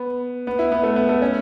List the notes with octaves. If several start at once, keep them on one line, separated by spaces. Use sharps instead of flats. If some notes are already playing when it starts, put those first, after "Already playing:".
Already playing: B3
B3
E4
B3
A3
B3
A3
C#4